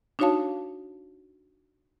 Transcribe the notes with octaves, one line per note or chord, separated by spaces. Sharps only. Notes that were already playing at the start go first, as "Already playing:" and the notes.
D4 D#4 F#4 C#5 F5 A5